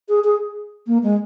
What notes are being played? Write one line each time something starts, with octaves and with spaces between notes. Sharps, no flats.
G#4
G#4
A#3
G#3